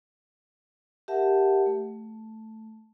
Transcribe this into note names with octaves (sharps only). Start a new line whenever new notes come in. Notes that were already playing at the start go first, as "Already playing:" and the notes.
G4 A#4 E5 F#5 A5
A3